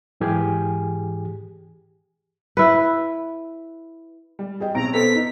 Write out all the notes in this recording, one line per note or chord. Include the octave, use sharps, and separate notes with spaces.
G#2 E3 G4 G#4 G#5
E4 B4
G3
G#4 D#5 G5
B1 C4 A#5 D7
B3 A4 C5 B6
D#4